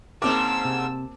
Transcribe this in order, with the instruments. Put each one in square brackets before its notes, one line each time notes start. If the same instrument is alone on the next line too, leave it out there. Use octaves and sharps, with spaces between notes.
[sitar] G#2 C#3 A#4 [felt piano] A#3 C4 D6 [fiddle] A5 E6
[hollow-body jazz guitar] C3